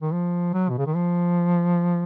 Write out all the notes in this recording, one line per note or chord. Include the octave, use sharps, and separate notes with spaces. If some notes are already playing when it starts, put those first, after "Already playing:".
D#3
F3
F#3
B2
C#3
D#3
F3